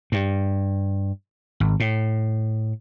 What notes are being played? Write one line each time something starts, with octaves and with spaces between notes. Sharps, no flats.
G2
G#1
A2